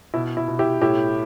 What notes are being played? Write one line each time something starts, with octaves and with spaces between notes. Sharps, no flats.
B2 E4
E4
B2
E4 G4
A2 E4 G4